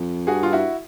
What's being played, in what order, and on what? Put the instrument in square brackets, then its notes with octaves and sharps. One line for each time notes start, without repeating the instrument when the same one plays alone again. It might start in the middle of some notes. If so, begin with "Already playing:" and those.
Already playing: [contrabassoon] F2
[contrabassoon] G2 [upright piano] F#4 G#4
[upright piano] F4
E4 F#4